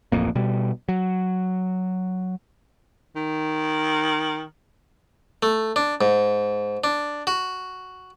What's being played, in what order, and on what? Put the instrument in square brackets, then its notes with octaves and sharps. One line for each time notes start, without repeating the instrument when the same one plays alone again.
[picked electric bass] D1 A1 F2 A#3
B2 G3
F#3
[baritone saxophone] D#3
[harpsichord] A3
D4
G#2
D4
F#4